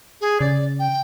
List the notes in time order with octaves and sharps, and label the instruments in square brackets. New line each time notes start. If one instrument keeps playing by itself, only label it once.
[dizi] G#4
[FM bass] C#3 [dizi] D5
[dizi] G5